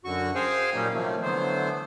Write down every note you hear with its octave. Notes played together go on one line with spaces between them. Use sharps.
F#2 D3 F#4 C#6
G#4 C5 F5 G5 G#5
A#2 F#3 G3 A#3 C#4 D#4
C3 D#3 F3 F#3 A3 A#3
D3 E3 F#3 A3 B3 C5